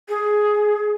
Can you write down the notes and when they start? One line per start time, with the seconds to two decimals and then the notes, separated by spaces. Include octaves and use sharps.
0.08 G#4